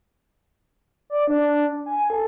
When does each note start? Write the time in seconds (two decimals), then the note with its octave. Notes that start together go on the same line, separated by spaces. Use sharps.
1.10 D5
1.27 D4
1.86 G#5
2.10 A4